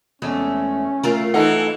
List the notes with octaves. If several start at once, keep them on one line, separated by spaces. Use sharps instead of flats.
E2 G#3 A3 C#4
A3 F4 A#4
E3 D#4 A4 F#5